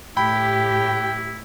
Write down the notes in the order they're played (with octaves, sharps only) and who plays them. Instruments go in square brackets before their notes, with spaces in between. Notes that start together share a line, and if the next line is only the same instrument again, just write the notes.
[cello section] A2 G4 [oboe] E4 [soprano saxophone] G5 [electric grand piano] B5